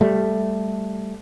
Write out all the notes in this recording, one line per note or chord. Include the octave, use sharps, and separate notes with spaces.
G3 A3